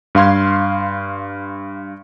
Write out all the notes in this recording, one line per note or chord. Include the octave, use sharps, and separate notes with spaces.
G2 F5 C6 G#6